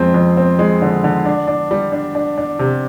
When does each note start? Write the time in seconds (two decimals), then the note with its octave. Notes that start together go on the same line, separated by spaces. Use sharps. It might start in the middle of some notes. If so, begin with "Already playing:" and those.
Already playing: F2 G#3 C4
0.14 F2
0.37 C4
0.59 G#3
0.82 D3
1.04 D3
1.25 D4
1.48 D4
1.71 G3
1.92 D4
2.15 D4
2.38 D4
2.59 C3